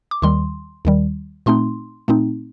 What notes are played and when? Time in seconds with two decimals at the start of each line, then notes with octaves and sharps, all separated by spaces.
0.11 D6
0.22 D#2 D#3 G3 C6
0.85 D#2 D#3 G3
1.46 A#2 A3 C4 D#4 C6
2.08 A#2 A3 C4 D#4